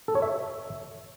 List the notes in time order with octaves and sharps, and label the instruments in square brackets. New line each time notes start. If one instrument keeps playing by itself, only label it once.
[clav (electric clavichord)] A4
C#5
E5